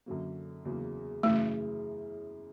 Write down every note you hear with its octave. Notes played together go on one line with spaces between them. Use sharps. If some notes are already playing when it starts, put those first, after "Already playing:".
F#2 D3 F#3 A#3
E2 C#3 F#3 A#3
F#2 C#3 E3 G#3 A3